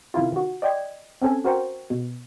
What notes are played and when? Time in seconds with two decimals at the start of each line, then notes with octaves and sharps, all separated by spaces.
0.14 C3 D#3 E4 F4
0.32 D#3 F#4
0.62 D5 D#5 G5 C6 G#6
1.22 C4 C#4 A4 G#5
1.44 F#4 A#4 C5 G5 C#6
1.90 B2